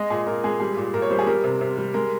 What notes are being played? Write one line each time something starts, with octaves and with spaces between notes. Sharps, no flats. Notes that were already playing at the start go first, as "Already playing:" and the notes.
Already playing: G#3 D#5
A#2 G#4
A#2 A#4
G#3 G#4
G3 G#4
A#2
A#2 A#4
C#5
G3 C5
G#4
G3 A#4
C3
C3
G3
G#3 A#4